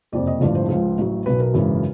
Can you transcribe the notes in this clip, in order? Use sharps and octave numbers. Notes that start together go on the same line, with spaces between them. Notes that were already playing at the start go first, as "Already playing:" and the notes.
F#1 F2 C3 D5
D#5
A1 G2 D3 F3 D5
C5
C#2 C#3 F3 C5
A1 A2 F#3
B1 B2 F#3 B4
A#4
G#1 F#2 C#3 E3